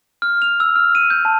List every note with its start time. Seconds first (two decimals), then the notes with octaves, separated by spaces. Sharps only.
0.22 F6
0.42 F7
0.60 E6
0.76 F6
0.95 D#7
1.10 G6
1.25 A5